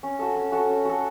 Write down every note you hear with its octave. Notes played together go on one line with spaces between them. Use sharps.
C#4
F#4 A4
C#4
F#4 A4
C#4
F#4 A4